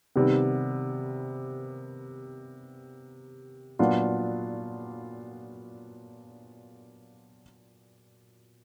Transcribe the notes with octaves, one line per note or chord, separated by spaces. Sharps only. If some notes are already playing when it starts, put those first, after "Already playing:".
C3 D#3 G3 B3
A#2 F#3 B3 D4 F4